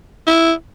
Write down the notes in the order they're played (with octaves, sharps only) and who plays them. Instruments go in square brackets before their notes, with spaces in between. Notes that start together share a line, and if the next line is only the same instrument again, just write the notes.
[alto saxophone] E4